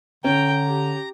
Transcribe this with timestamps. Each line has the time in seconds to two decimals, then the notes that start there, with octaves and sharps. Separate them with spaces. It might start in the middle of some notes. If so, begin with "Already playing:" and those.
0.24 D3 C#4 G5 A#5
0.66 G4